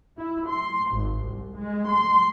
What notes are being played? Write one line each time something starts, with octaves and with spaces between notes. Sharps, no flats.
E4
C6
G#1
C2
G#3
C6